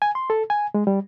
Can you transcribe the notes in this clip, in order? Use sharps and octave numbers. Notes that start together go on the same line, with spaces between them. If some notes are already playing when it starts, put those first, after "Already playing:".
G#5
C6
A4
G#5
G#3
G3